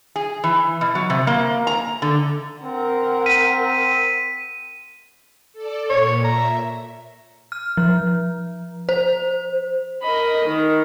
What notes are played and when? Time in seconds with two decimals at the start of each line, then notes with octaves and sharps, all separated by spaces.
0.16 G#4
0.44 E3
0.81 B2
0.95 F#3
1.10 C3
1.27 A#3
1.67 A#5
2.02 D3
2.63 C4 A#4 F#5
3.26 B6 D#7
5.53 A4 D5
5.90 A#2 C#5
6.24 E5 A#5
7.52 F6
7.77 F3
8.89 C5
10.03 A#4 D#5 B5
10.46 D#3